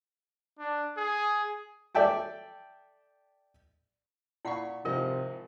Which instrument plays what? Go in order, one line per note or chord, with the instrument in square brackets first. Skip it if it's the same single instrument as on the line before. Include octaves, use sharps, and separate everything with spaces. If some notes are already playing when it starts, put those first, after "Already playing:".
[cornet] D4
G#4
[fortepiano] A4 D5 E5 G5 A5
[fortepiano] A#2 B5 C#6 [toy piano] E4 F5 F#5
[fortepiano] G#1 F3 D#5 [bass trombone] C3 [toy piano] A#4